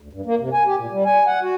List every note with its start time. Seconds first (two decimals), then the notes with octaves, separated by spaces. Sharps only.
0.01 D2
0.13 G2
0.26 A#3
0.40 C3
0.53 G#5
0.66 G4
0.78 A#2
0.92 G3
1.05 G#5
1.27 F#5
1.42 F#4